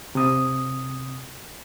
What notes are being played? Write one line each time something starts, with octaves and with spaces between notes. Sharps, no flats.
C3 D#6